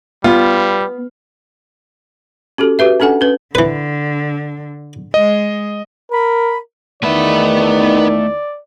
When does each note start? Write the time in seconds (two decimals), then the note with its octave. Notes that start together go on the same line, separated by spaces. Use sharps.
0.24 G3 B3 F4
2.58 C#4 F#4 G4 A4
2.79 F#4 G4 B4 E5
3.00 C#4 D4 A4 F#5 G#5
3.21 C#4 B4
3.55 D3 E3 B4
5.14 G#3 D#5
6.12 A#4 B5
7.03 E2 D#3 A3 B3 B4 D5 E5